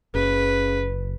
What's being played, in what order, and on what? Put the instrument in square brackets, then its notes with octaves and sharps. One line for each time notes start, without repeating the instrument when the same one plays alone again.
[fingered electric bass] F#1 [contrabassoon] C#3 [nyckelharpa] B4